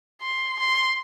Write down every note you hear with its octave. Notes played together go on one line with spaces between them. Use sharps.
C6
C6